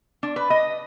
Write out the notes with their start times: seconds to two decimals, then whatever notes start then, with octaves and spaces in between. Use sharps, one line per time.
0.23 D4
0.36 B4
0.50 D#5